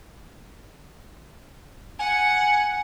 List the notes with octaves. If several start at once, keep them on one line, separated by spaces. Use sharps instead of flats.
F#5 G#5